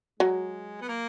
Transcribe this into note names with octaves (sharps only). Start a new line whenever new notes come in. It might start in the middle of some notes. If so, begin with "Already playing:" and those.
F#3 G#3
B3
A#3